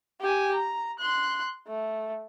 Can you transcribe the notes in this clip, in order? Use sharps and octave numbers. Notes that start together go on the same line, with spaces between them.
G4 G#5
A#5
C6 F#6
A3